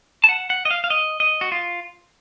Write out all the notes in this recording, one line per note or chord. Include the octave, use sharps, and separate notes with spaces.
A5
F#5
F#5
D#5
F5
F5
D#5
D#5
F#4
F4